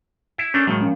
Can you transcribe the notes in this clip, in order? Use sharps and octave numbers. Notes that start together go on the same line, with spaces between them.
E4
A3 A#3 C#4 D4
A2 D#3 F#3 G#3 A#3
F3 A#3 C#4